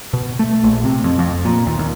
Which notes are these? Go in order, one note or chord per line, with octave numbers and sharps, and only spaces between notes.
B2
A3
A#1
C3
F2
F2
A#2
D#2
D#2